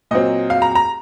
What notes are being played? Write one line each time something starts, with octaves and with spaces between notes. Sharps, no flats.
A#2 F#3 C4 D#5
F5
A#5
A#5